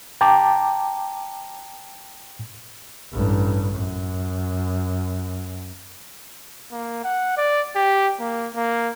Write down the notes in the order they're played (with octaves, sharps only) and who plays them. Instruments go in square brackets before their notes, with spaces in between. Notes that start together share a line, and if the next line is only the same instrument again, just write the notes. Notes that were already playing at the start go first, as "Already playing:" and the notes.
[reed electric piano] G5 A5 A#5 D6
[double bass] A1 G2
F#2
[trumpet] A#3
F#5
D5
G4
A#3
A#3